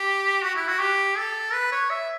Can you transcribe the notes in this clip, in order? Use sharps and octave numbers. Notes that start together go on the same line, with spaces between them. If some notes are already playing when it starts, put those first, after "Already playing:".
Already playing: G4
F#4
E4
F#4
G4
A4
B4
C#5
E5